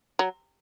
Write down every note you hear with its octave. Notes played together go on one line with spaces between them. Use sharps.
F#3